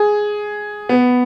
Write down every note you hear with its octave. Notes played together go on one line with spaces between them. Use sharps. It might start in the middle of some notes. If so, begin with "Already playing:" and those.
Already playing: G#4
B3